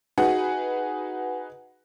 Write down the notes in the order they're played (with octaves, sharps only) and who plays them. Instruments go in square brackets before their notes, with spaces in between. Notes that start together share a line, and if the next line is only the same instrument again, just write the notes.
[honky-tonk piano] D#4 F#4 G#4 B4 F#5